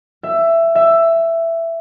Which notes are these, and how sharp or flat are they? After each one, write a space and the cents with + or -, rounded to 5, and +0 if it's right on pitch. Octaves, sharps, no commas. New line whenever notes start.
E5 +15
E5 +10